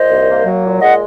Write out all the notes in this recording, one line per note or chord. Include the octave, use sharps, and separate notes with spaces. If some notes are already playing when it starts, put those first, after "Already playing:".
Already playing: A#2 C5 D#5
C2
A#3
F#3
A#2
G#3 D#5 F#5